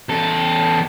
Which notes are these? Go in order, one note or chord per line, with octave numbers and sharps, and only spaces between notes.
E2 A4